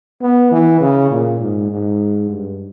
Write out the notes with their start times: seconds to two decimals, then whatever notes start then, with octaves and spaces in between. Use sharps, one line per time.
0.22 B3
0.51 E3
0.81 C#3
1.11 A#2
1.41 G#2
1.71 G#2
2.30 G2